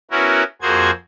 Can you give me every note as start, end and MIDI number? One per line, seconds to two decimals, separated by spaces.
0.11 0.43 59
0.11 0.43 61
0.11 0.43 64
0.11 0.43 66
0.11 0.43 70
0.62 0.91 41
0.62 0.91 58
0.62 0.91 66
0.62 0.91 68
0.62 0.91 72
0.62 0.91 92